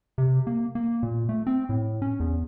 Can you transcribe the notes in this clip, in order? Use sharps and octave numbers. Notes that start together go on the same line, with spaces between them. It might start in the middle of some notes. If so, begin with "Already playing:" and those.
C3
A#3
A#3
A#2
A3
C4
A2
C#4
E2